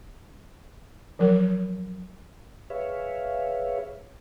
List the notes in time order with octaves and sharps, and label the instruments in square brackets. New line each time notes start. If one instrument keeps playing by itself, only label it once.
[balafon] F3 F#3 A#4
[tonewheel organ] G#4 B4 C#5 E5 F5